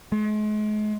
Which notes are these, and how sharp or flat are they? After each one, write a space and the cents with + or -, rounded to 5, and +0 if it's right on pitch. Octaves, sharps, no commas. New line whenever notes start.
G#3 +40